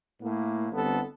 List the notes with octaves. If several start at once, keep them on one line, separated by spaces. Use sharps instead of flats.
A2 A#3
G1 B3 C4 A4